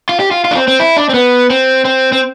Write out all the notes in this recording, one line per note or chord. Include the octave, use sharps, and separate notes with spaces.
F4
G4
F4
F4
D4
C4
C4
E4
D4
C4
B3
C4
C4
C4